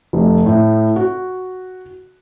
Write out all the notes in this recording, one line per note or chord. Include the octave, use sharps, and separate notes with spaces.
F1
A2
F#4